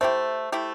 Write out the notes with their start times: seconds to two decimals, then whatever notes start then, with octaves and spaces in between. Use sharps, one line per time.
0.01 A3 E4 G4 C5
0.52 A3 E4 G4